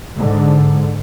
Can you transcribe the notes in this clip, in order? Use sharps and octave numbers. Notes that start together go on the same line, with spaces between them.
G#2 D3